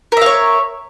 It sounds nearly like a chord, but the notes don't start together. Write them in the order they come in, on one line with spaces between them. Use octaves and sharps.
A#4 E5 F5 C#5